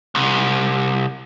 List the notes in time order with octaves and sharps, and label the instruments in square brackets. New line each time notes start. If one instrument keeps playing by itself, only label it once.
[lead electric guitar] C2